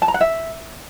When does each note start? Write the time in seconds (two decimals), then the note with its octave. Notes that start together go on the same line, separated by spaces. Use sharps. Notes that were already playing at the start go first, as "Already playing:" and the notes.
0.02 A5
0.08 A#5
0.14 F#5
0.21 E5